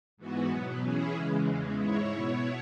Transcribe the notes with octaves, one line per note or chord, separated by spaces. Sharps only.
G#2 E3 B3 F#4
B2 F#3 B3
E3 C#4 E4 G#4
C#3 E3 G#3
E2 C#3 E3 G#3
G#2 G#3 E4 C#5
B2 B3 E4 C#5